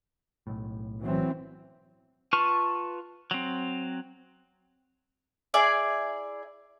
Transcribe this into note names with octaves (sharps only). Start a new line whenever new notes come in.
B1 A2
E3 F#3 C4
F4 B4 A5 C#6 F6
F#3 C4
E4 G#4 D5